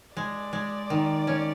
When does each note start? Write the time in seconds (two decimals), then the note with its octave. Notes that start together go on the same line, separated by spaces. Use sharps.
0.16 G#3 D5
0.53 G#3
0.90 D#3
1.27 C#4